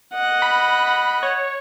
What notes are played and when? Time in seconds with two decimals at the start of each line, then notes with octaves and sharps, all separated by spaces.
0.14 D#5 F#5
0.42 B5
1.23 C#5